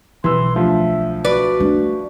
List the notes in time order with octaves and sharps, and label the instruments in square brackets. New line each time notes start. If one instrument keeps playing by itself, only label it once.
[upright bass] B1 [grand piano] E3 E6 [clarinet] C6
[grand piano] D2 F3 [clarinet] E5
[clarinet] F#4 [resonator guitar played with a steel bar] B4 D5
[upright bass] A3 D4